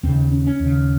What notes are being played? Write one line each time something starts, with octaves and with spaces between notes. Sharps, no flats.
D#2 C#3 C4
C#4
C#4
D#2 C#3